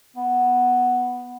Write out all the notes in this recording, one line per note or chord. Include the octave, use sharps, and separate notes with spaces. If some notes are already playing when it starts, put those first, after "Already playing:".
B3